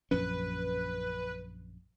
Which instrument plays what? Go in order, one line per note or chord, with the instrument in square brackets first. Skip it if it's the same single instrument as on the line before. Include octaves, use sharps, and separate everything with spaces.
[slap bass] A#1 F#2 C#4 [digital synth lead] B4